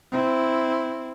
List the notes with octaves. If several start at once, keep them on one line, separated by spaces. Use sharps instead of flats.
C4 E4